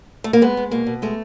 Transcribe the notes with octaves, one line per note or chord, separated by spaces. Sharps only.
A3
A#3
G#3 B3
G#3
B2 A#3
B2
G#3 A3